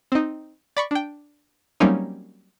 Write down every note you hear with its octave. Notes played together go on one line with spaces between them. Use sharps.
C4 D#4
D5 B5 C#6
D4 G5
F#3 G3 A#3 C4 C#4 D#4